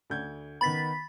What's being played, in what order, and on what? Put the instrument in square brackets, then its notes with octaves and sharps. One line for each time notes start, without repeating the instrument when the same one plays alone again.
[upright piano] D2 G6 G#6
[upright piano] D#3 B3 [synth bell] B5 A6 B6